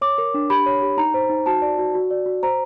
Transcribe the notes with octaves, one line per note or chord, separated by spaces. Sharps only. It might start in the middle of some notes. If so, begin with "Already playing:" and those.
C#5 D6
A#4
D4
G4 B5
C#5
G4
D#4 A#5
C5
D#4
F#4 A5
D5
F#4
F#4
D5
F#4
C5 A#5